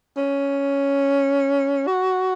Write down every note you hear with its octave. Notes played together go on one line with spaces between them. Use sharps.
C#4
F#4